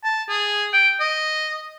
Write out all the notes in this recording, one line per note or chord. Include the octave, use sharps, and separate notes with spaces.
A5
G#4
G5
D#5